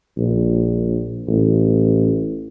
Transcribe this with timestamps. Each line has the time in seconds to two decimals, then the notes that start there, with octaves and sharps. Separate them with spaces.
0.17 A#1
1.28 A1